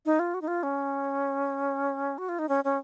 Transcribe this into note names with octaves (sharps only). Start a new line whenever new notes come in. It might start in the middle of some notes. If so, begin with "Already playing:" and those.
D#4
F4
F#4
D#4
F4
C#4
F#4
F4
D#4
C#4
C#4